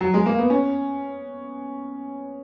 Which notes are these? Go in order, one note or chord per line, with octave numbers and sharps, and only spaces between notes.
F#3
G#3
A#3
B3
C#4